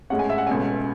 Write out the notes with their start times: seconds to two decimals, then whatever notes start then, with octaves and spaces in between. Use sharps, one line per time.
0.10 A2 G#3 C#4 F#5
0.19 G#5
0.30 E5
0.38 F#5
0.47 C#2 B2 A3 C#4 G#5